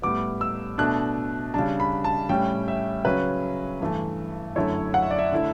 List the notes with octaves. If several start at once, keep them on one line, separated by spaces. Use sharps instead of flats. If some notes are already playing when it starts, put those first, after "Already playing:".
A2 G3 B3 D6
E6
B2 A3 D4 F#6
C#3 G3 D4 A5
B5
A5
A2 G3 C#4 G5
E5
C#3 F#3 C#4 B4
G2 E3 A3
F#2 D3 A3 E4 C#5
F#5
E5
D5
E5
D3 A3 E4